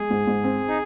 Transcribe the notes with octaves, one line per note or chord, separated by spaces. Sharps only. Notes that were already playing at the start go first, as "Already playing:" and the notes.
Already playing: G#3 G#4
G#2
G#2
C4
D#4